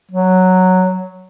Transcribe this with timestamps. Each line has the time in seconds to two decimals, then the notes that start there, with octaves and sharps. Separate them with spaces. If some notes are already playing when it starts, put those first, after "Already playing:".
0.11 F#3